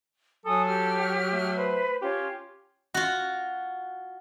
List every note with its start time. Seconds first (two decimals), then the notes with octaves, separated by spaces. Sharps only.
0.45 F#3 A4 G#5 D#6
0.67 G4 F6
1.33 A3
1.56 B4 C5
2.02 C#4 F4 G4 C#5
2.94 F4 F#4